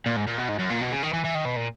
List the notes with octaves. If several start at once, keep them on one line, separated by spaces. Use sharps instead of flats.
A#2
G#2
A#2
B2
G#2
F#2
A#2
B2
C#3
D#3
E3
E3
D#3
B2
A#2